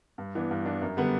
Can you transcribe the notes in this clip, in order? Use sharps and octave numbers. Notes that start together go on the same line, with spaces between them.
G2
E3 B3 D4
G2
E3 B3 D4
F#2
D3 G3 B3